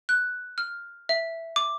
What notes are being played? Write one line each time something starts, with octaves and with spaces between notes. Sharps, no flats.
F#6
F6
E5
D6